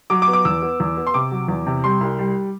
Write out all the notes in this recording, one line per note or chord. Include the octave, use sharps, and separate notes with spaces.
F#3 D6
D6
B3
D6
E2 E6
B3
E2
B3
C6
C3 D6
F#3
E2
C3
G3 C6
C2
G3